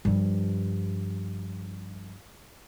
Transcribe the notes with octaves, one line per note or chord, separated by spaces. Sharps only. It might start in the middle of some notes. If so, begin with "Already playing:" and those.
G2 F3